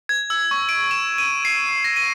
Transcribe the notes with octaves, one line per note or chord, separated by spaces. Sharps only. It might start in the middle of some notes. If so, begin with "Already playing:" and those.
G#6
E6
C#6
D7
E7
D#7
C7
A#6
D#7